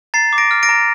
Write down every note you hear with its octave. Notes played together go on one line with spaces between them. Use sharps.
A#5 A6 C7
D6
A#6 D7
F6
A#6 D7
A#5